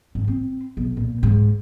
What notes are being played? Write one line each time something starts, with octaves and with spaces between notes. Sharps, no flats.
G#2
C4
B1
A#2
G#2